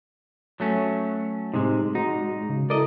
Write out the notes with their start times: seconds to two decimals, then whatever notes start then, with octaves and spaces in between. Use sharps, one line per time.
0.60 F#3 A3 C#4
1.54 A2 C3 G#3 D#4
1.95 G#3 D#4 F#4
2.50 C#3
2.70 E4 A4 A#4 D5 D#5